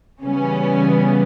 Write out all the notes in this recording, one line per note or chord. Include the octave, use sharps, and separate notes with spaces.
C#3 E3 G3 B3 C#4